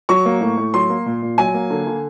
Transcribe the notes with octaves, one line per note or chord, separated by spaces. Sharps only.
F#3 C#6
A#3
A2
A2
F#3 C6
A#3
A#2
A#2
F#3 G#5
A#3
D3
D3